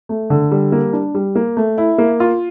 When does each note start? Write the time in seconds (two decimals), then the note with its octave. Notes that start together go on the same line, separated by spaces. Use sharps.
0.09 A3
0.30 D3
0.51 G3
0.72 A#3
0.93 D4
1.15 G3
1.35 A#3
1.57 A3
1.78 E4
1.98 A#3
2.20 F4